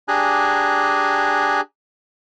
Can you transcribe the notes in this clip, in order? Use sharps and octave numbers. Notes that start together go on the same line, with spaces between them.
D4 G4 G#4 G#5 A#5 F#6